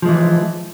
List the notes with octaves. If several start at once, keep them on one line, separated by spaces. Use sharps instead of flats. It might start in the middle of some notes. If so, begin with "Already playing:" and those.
E3 F3 G#3